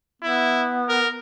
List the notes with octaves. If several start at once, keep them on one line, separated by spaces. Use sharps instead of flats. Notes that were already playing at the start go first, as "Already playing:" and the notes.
B3 E4
A#4